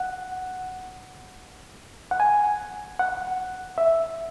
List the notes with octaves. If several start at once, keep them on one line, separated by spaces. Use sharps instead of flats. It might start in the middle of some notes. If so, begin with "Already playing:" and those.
Already playing: F#5
F#5
G#5
F#5
E5